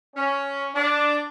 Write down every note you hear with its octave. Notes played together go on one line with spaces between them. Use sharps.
C#4
D4